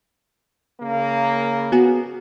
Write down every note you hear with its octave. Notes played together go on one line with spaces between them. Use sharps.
C#3 A#3
B3 F#4 G#4